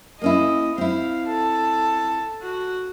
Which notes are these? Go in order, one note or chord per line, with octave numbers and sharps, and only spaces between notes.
A#3 C#4 E4 D#5
C4 E4 F5
A4
F#4